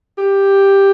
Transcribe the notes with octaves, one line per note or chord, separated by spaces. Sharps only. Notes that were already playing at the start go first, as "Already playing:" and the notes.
G4